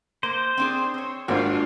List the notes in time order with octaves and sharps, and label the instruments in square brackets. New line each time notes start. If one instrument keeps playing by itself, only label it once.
[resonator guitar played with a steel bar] A#3 [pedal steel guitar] C5
[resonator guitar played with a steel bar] C4 D4 G#4
C4 C#5
[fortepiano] G#1 A#3 C5 [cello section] D4 F4 [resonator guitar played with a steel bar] F#4